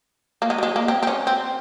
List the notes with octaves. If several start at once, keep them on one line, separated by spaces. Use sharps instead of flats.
A#3
G#3
G3
G#3
A#3
C4
C4
C#4
C4